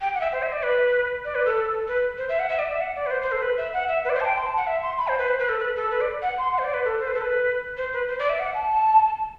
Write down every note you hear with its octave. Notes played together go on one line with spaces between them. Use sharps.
G5
F#5
E5
C5
E5
D5
B4
D5
B4
A4
B4
C5
E5
F#5
E5
D5
E5
F#5
D5
B4
C5
C5
A4
C5
B4
E5
F#5
E5
B4
D5
C5
A5
G5
C6
A5
F#5
E5
C6
B5
C5
B4
C5
B4
A4
B4
A4
B4
D5
F#5
C6
F#5
C5
D5
B4
A4
C5
B4
A4
B4
C5
B4
C5
D5
E5
F#5
A5